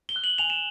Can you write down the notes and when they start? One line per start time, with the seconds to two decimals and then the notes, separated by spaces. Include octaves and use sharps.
0.09 G7
0.16 F#6
0.24 F#7
0.38 G#5 F7
0.50 E7